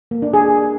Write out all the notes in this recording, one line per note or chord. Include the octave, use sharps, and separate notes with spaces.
A#3
D4
G#4